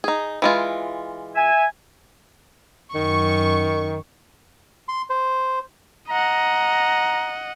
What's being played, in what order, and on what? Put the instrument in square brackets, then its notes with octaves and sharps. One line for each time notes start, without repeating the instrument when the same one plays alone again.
[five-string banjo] D#4 G#4
E3 G#3 F4
[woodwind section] E5 G#5
[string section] F#2 C#6 [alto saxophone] D#3
[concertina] C6
C5
[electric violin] D#5 F#5 [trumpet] A#5